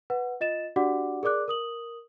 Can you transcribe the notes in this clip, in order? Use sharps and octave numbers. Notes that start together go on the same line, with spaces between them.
B4 F#5
F4 D#5 A6 E7
D4 F#4 G4 D5 F#5 D6
G#4 A#4 D5 D6 F#6
A#4 D#6 F#7